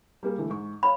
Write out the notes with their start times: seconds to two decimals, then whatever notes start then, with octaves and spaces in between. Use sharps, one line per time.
0.23 G3 A#3 G#4
0.37 D3 E3 A3
0.50 G#2 C#6
0.83 C#5 F5 B5